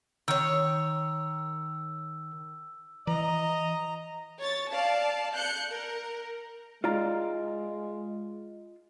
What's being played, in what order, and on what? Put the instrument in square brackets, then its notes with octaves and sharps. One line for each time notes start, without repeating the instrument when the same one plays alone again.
[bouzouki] D#3 C#5 [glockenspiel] E6
[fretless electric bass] E3 [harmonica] D#5 [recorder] A#5
[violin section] C#5 A6
D5 F5 A5
F#6 G6 C#7
A#4
[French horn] G#3 [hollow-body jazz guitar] F4 D5 A#5